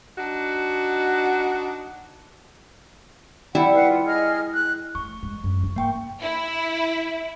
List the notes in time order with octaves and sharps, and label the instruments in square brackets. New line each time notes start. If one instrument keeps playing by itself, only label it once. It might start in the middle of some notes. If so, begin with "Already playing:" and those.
[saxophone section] D4 D#4 F#4
[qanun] G3 E4 E5 [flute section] F#5
[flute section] B4 F5 F#5
F4
G#4 D#5 F6
F#6
[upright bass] A3 [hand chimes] C#6
[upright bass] G#3
F#2
D#3
[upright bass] G#2 [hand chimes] A#3 G5 C#6
[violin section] E4